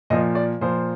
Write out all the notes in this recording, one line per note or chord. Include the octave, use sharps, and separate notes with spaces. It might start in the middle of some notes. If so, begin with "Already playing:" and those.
A#2 F3 D#5
D5
A#2 F3 C5